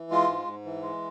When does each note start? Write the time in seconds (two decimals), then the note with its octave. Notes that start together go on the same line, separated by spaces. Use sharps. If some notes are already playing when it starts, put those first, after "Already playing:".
Already playing: E3
0.11 G#3 F4
0.29 G#2
0.47 G#2
0.65 E3
0.82 G#3